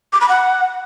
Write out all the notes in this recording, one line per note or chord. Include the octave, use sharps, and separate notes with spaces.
D6
B5
F#5